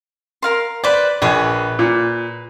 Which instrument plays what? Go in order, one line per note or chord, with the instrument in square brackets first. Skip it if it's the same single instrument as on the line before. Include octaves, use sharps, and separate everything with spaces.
[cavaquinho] A#4 F5 C6
[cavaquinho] B4 C5 [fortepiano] D5
[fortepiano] A#1 [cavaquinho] G#4 B4 C#5
[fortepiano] A#2